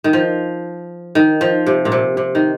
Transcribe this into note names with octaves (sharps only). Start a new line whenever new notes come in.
D#3
F3
D#3
F3
C3
A#2
C3
C3
D#3